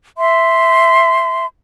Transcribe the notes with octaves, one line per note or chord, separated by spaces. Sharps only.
E5 C6